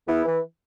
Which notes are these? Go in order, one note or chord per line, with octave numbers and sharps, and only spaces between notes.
E2 B3 E4
E3